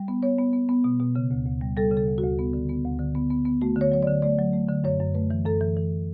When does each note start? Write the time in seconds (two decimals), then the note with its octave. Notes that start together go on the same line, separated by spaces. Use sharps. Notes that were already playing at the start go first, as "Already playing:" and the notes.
Already playing: G3
0.08 B3
0.23 B3 C#5
0.39 B3
0.53 B3
0.69 B3
0.84 B2
1.00 B2
1.16 C#3
1.31 D2
1.45 D2
1.61 G3
1.77 G3 A4
1.91 C#3
1.97 A4
2.07 D2
2.18 F#4
2.23 D2
2.39 B3
2.53 D3
2.69 B3
2.85 D2
2.99 D3
3.15 B3
3.31 B3
3.45 B3
3.62 A3 F#4
3.76 D3 C#5
3.92 F#3 C#5
4.02 D3 D5
4.22 A3 D5
4.38 F#3
4.53 A3
4.69 D3
4.84 F#2 C#5
5.00 F#2
5.14 A3 B4
5.31 E3
5.45 F#2 A4
5.61 E3
5.77 E3